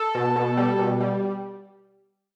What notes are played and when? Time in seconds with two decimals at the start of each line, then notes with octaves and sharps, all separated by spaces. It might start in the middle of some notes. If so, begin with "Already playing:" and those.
Already playing: A4
0.15 B2
0.36 B2
0.57 G3
0.79 B2
1.00 G3